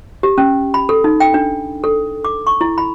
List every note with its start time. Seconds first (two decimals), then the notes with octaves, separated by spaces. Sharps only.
0.23 G4
0.38 C#4
0.74 B5
0.89 A4
1.04 D#4
1.20 G5
1.34 D4
1.84 A4
2.25 D6
2.47 C#6
2.61 E4
2.78 B5